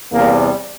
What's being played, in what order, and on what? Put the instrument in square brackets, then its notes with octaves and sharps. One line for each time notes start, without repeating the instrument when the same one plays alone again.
[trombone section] E2 C3 G3 A#3